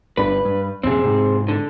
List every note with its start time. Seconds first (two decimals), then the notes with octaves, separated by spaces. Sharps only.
0.17 G1 G2 D4 B4
0.45 G2
0.83 A#1 F#2 C3 C4 G#4
1.04 G#2 C3
1.48 D3